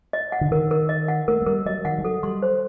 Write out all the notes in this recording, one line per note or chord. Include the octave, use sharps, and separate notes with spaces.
D#5
F#5
D3
D#3 A#4
A#4
D#5
F#5
A3 A#4
A3
G3 A#4
F#3 D#5
D#3 F#5
G3
F#3 A4
G3 C6
C5